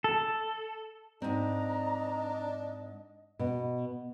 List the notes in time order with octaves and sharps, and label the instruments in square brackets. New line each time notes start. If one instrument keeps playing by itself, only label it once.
[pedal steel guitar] A4
[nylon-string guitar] G#2 C4 [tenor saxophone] D4 [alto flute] D#5 [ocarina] A#5
[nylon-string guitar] B2